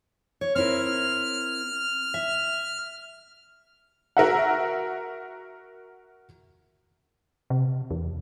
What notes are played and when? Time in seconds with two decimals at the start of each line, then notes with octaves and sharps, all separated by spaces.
0.41 C#5
0.55 C4 E4 A#4 F6
2.14 E5
4.17 F#4 A#4 E5 F#5
7.50 C3
7.91 E2